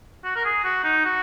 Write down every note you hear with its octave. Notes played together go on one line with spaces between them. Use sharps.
F#4
A#4
G#4
F#4
D#4
F#4